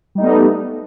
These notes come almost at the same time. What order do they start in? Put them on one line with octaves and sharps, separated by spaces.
G3 D#4 A3 B3